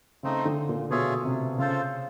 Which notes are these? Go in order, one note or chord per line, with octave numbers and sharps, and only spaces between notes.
C#3 A3 C4 D#4
D3
A#2
B2 F4 G#4 C#5 E5
C3
C#3 F4 A4 C5